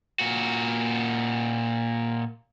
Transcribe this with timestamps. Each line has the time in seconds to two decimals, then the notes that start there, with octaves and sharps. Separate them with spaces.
0.19 A#2 F#4